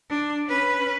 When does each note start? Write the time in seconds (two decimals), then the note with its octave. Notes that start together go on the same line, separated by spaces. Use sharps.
0.10 D4
0.47 C#4 B4